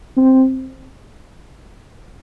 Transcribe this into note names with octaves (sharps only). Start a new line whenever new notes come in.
C4